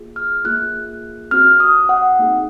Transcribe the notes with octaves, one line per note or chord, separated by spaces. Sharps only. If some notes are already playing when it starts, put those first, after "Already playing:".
Already playing: A#3 F4 G#4
F6
A#3 F4 G#4 F#6
C4 F#4 F6
D#6
F#5
A#3 D#4 G#4